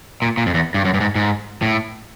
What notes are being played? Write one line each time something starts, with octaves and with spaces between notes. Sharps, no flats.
A#2
A#2
F2
E2
G2
F#2
G2
G#2
G#2
A2